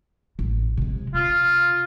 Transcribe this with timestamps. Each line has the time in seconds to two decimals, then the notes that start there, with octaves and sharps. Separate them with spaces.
0.39 A1
0.77 C3 G#3
1.14 C3 F4